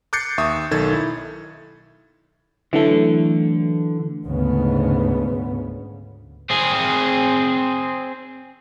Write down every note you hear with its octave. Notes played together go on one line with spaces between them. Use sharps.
D6 F#6 G6 A6 C7 C#7
D#2 E5 C#6 D#6
B1 D#3 A4 G#6 A6
E4
D3 E3 F#3 A3
D2 G#2 C#3 B3
C4 G#4